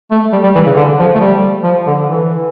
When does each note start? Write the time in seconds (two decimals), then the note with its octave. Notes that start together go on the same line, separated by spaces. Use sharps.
0.11 A3
0.32 G3
0.43 G3
0.55 E3
0.66 C#3
0.76 D3
0.99 F3
1.15 A3
1.20 G3
1.64 F3
1.87 D3
2.08 E3